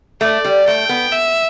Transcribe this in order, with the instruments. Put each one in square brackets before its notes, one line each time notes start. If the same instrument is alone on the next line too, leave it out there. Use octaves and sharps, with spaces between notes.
[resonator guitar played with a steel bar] A3 [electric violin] D5
[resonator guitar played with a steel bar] G3
[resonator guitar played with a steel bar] A3 [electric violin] G5
[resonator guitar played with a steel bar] B3
[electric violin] E5